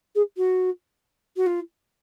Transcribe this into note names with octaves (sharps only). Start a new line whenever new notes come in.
G#4
F#4
F#4
F4